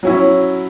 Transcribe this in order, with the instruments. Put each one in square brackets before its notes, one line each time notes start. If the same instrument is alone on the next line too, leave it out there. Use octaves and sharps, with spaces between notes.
[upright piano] F#3 C#4 E4